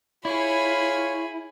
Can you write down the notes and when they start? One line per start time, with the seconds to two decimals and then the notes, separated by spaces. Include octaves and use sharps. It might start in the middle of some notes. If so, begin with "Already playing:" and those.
0.25 E4 F4 G#4 C#5 B5